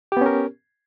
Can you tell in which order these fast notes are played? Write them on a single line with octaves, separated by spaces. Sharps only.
G4 B3 C#4 A#4